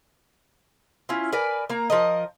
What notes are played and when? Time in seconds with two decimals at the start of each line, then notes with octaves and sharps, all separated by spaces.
1.09 C#4 E4 F4
1.33 A#4 B4 D5 G#5
1.70 A#3 A#5
1.90 F3 A#4 D#5